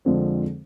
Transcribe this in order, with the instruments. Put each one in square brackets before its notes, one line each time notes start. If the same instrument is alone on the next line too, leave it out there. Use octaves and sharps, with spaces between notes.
[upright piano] F2 D3 F3 G#3 C4